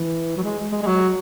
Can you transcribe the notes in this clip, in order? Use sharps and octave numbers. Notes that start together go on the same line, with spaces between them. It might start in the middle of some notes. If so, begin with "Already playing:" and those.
Already playing: E3
F#3
G#3
G#3
G#3
F#3